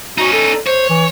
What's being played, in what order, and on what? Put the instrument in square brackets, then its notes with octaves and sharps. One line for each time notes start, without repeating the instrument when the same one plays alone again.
[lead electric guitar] C#4 D#4 [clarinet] F#4
[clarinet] A4
[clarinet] C5 [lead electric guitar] C#5
[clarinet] E3